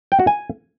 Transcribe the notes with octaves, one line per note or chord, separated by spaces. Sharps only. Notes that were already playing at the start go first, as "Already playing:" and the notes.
G5
F#4
G#5